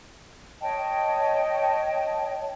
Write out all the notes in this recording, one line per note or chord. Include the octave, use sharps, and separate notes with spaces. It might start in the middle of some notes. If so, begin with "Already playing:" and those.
C#5 D#5 G5 A5